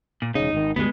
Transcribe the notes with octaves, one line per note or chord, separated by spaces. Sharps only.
A#2
E1 C#3 D#4
G#1 D#3
D2 G2 G#3 B3